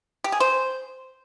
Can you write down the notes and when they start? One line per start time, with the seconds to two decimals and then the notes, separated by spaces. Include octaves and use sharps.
0.24 G4
0.32 G#4
0.40 C5